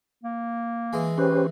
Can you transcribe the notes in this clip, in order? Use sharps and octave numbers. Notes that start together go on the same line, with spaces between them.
A#3
E3 G#3
C#4 G4 B4 C5